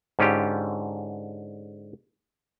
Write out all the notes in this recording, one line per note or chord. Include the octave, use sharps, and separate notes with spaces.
G#2 D3 C#4 F4 G4